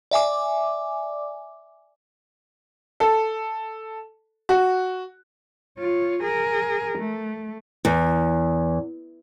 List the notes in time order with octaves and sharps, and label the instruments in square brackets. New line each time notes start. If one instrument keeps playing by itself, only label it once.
[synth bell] D5 E5 G#5 D6
[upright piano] A4
F#4
[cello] F4 C#5
G#4 A#4
A3
[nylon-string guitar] E2